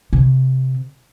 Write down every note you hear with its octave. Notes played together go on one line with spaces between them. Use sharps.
C3